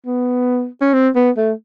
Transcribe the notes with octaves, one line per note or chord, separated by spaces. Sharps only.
B3
C#4
C4
B3
A3